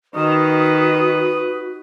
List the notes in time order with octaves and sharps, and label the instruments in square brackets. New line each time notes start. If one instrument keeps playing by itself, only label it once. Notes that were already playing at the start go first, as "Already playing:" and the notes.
[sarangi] D#3 [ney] F#4 [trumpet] B4 [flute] D#6